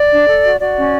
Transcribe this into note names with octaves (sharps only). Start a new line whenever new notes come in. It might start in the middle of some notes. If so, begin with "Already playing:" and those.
Already playing: D5
D4
A4
F#4
F#4 D5
C#4